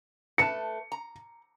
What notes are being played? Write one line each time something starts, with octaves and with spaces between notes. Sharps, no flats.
A3 B4 A5 C#7
A#5